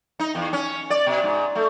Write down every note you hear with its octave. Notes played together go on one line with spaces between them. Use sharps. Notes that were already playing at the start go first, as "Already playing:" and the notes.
D#4
E2
C#4
D5
B2
G#2
A3